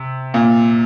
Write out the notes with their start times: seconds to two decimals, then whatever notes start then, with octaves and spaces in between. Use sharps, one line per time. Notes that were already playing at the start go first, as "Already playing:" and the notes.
Already playing: C3
0.34 A#2